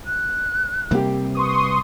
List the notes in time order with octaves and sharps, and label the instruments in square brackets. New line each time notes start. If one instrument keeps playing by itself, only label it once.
[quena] F#6
[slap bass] C3 G3 C4 [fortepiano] A#3 G4
[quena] B4 [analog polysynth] C6 C#6 D#6